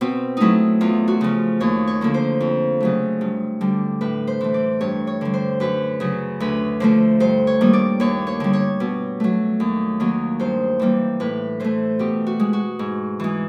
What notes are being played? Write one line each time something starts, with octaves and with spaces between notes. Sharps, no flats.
B2 C4
F#3 A3 D#4 E4
E2 F4
F#4
C#3 F3
D#2 C#5
C#5
D3 F3 A#3
C5
F2
C#3 F#3 A3
G2
D3 G3
A2 B4
C5
E3 A3
D5
G2 C#5
C#5
D3 G3
C5
F#2 B4
C#3 F#3
D2 B4
D3 F3 A3 C5
G2 C5
C#5
D#3 G3 A#3
D5
D#2 C#5
C#5
D3 G3
C#5
B2
F#3 A3
D#2
D#3 F#3 A#3
G2 C5
E3 G3 A#3
A2 B4
E3 A3 C5
B2 G4
F#4
G#3
F#4
G#2
E3 G#3